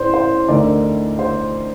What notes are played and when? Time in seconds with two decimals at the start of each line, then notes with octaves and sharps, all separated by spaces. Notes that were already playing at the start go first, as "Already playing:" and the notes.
Already playing: A1 A2 C5 D5
0.14 C5
0.48 D2 D3 A3 D#4 A#4 D5
1.19 C5